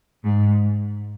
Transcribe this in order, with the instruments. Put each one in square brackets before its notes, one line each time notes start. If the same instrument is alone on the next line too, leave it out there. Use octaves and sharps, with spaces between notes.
[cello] G#2